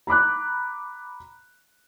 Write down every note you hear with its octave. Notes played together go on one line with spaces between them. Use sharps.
A#5 B5 D6 F#6